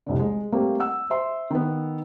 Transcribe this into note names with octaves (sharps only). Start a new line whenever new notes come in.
F1 C2 D3
G#3
G3 A3 A#3 C4
F#5 E6
C5 E5 C6
D#3 B3